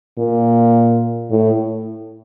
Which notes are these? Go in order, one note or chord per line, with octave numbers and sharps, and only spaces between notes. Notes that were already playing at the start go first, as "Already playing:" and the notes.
A#2
A2